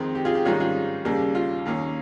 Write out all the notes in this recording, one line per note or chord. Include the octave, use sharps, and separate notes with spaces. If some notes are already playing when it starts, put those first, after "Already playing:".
Already playing: F2 D#3 G#3 C4
G4
F4 G#4
G4
G#2 D#3 G3 C#4 F4 G#4
F4 G#4
D#2 C#3 G3 A#3
F4
D#2 D#3 A#3 C#4